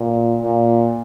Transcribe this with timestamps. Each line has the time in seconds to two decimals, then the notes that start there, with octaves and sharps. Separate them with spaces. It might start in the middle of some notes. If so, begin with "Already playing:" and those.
Already playing: A#2
0.42 A#2